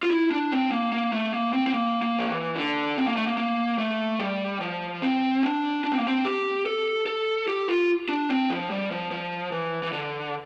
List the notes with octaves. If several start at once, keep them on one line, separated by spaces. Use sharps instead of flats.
F4
E4
D4
C4
A#3
A#3
A3
A#3
C4
C4
A#3
A#3
F3
E3
D3
C4
A#3
A3
A#3
A#3
A3
G3
F3
C4
D4
D4
C4
A#3
C4
G4
A4
A4
G4
F4
D4
C4
F3
G3
F3
F3
E3
E3
D3